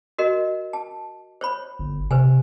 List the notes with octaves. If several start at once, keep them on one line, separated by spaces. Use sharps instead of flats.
F#4 A#4 D#5
A5
C5 C#5 B5
G1
C3 B4 C5 G#5